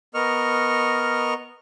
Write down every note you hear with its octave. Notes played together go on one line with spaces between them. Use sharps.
B3 A#4 D#5 C#6 F6